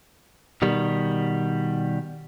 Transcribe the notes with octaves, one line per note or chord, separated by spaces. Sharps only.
B2 D#3 G3